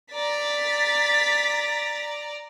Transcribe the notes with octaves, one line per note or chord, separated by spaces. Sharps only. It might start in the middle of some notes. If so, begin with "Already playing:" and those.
D5 A#5 A6 B6